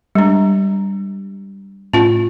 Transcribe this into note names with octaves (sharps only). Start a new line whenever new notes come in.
G3 G#3 D4
A2 C#4 F4